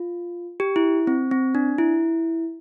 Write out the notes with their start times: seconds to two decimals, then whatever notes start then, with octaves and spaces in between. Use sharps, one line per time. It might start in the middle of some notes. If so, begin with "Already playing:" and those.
Already playing: F4
0.60 G4
0.76 E4
1.07 C4
1.31 C4
1.55 D4
1.78 E4